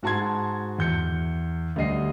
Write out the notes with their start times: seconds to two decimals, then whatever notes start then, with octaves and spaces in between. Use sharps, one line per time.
0.03 G#2 F#4 A5 C6 G#6
0.79 E2 G6 C#7
1.76 D2 G3 D#5 C7